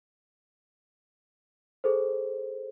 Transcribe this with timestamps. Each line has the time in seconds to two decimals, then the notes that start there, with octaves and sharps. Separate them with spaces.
1.84 G#4 A4 C5